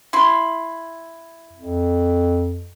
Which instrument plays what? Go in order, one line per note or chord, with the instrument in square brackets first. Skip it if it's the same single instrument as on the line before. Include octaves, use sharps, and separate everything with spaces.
[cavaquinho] E4 C6
[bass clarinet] F2